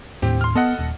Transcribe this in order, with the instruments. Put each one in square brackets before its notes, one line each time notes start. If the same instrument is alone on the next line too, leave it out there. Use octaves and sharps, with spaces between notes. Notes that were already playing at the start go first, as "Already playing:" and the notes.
[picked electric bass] D#2 A2 [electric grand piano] C4 G4
[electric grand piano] C6 F6
[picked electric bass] B3 [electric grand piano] A4 D#5 F#5
[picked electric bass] D#1